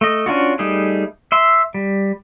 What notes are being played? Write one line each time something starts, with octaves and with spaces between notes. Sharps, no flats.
A3 D#5
C#4 D4 F4 F#4
G3 A3 D#4 G#4
E5 C6
G3